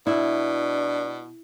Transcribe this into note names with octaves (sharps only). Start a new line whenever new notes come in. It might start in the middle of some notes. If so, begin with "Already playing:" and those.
B2 D4 E4